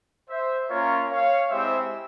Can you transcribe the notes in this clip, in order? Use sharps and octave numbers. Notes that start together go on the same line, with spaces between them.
C5 E5
A#3 C#4 F4 A#4 C#5
C#5 F5
G#3 C4 E4 G4 C5 E5